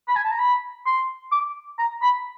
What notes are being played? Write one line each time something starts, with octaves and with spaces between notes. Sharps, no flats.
B5
G#5
A5
A#5
B5
C6
D6
A#5
B5